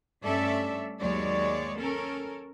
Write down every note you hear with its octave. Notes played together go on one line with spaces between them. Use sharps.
G2 A3 C#4 A4 D5 E5
D#2 F#3 G#3 C#5 D5
C#4 A4 A#4